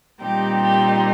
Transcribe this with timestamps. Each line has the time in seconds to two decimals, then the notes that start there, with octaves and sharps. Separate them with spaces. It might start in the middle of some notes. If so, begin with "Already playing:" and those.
0.21 A#2 G3 C4 D#4 G4
0.61 G4